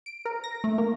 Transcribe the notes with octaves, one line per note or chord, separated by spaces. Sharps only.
D7
A#4
A#6
A3
A#3